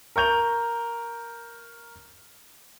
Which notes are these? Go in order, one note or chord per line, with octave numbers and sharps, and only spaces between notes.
A#4 C#6 G6 F7